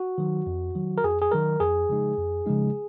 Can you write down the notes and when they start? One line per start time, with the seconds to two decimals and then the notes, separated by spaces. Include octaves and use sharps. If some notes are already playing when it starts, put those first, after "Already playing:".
Already playing: F#4
0.18 D#3 F#3
0.46 F2
0.75 D#3 F#3
0.98 A#4
1.04 F2 G#4
1.22 G#4
1.32 D#3 F#3 A#4
1.60 F2 G#4
1.89 C#3 F3 G#3 D#4
2.17 F2
2.46 C#3 F3 G#3 D#4